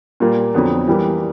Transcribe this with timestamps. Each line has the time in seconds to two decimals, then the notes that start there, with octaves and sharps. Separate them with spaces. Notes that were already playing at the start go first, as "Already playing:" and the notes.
0.20 A#2 G3 A#3
0.54 F2 D3 F#3 B3
0.87 E3 G3 A#3